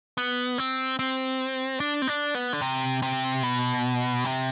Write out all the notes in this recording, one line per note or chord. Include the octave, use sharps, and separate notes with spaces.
B3
C4
C4
D4
C4
D4
B3
D3
C3
C3
B2
C3